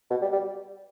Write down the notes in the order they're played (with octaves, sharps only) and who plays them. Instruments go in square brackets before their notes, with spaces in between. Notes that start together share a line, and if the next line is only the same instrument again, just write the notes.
[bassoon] B2
G3
G3